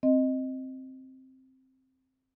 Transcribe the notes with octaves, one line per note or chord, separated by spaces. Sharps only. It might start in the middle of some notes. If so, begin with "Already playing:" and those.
C4 D#5